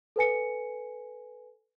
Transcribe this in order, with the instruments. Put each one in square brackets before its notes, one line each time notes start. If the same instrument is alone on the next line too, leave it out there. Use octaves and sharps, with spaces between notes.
[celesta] A4 B4 G#5 C#7